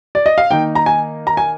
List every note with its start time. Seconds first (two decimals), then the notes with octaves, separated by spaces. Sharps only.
0.15 D5
0.26 D#5
0.38 F5
0.51 D#3 A#3 D#4 G5
0.75 A#5
0.86 G#5
1.27 A#5
1.37 G#5